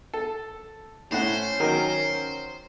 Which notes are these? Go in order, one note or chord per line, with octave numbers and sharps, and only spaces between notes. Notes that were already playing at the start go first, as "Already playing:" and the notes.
A4
A2 C#4 C5 F#5
D#3 F#3 A#4